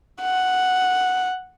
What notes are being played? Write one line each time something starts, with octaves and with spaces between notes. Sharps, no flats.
F#5